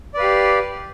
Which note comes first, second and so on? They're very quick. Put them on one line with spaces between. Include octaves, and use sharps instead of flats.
D5 B4 F5 G4